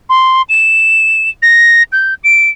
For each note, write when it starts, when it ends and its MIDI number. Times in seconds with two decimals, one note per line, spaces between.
0.09 0.42 84
0.49 1.29 100
1.42 1.83 94
1.92 2.14 91
2.24 2.50 98